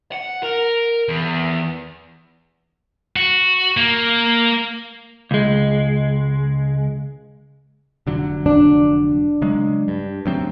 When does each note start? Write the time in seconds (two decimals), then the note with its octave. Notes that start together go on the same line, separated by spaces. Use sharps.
0.12 F#5
0.43 A#4
1.09 E2
3.16 F#4
3.77 A#3
5.31 C#2 G#3
8.07 F1 D3 F#3
8.46 D4
9.42 C#3 F#3 G#3
9.88 G2
10.26 D2 F#3 C4